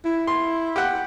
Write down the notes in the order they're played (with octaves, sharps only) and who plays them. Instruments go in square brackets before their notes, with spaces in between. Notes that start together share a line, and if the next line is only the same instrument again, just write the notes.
[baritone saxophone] E4
[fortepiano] C6
G4 F#5